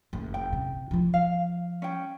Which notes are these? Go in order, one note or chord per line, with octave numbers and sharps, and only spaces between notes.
F#1
G5
C3
F3 F4
F5
C#4 G5